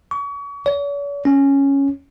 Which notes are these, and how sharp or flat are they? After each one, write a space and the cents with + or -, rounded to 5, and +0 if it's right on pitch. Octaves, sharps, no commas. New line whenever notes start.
C#6 +35
C#5 +45
C#4 -5